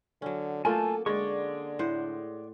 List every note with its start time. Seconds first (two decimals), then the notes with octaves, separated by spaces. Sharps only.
0.22 D3 F#3 C#4
0.65 A3 A#3 F4 A4 G#5 A5
1.06 D3 G#3 D5 C#6
1.79 A2 C5 F#5